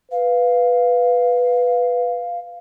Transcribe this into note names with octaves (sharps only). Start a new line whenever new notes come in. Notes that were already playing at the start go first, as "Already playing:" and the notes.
B4 F5